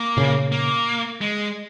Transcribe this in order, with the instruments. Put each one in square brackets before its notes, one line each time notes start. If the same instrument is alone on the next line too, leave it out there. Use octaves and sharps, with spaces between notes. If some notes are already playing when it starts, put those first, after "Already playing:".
Already playing: [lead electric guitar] A#3
[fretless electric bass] A#2 C#3
[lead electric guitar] A#3
G#3